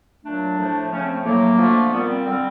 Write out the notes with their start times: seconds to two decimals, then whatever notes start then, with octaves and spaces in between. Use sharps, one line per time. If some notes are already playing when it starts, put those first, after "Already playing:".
0.25 A#2 F#3 A3 D4
0.58 A2 F3 A3
0.92 C#3 F3 A3 C#4
1.02 C4
1.14 A3
1.25 A2 F#3 A3 A#3
1.58 D3 F3 A3
1.92 A#2 G3 B3
2.03 B3
2.09 C4
2.25 D3 G3 C4